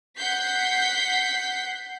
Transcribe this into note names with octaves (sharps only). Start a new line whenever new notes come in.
F#5 G6 B6 C7